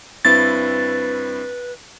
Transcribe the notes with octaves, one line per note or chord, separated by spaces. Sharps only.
G2 C4 E4 B4 A6